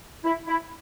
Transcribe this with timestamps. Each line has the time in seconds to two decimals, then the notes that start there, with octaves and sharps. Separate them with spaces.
0.24 E4
0.47 E4